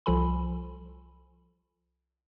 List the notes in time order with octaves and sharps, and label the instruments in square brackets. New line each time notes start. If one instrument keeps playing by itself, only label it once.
[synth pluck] C2 F3 F4 A4 G#5 B5